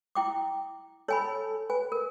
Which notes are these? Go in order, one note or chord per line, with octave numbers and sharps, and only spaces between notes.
E4 G5 D6
A4 C#5 G#5 B5
B4 G#5
A#4